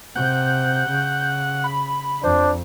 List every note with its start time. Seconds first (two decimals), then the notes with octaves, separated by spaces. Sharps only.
0.16 C3 F#5 G6
0.90 C#3
1.64 B5
2.24 F2 D4 C5